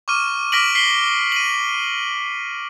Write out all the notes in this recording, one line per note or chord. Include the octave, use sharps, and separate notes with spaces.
C#6 D6 F6 D#7
D6 F6 A#6 B6 D7 F#7
B6 C7 F#7 G7
D#7 F#7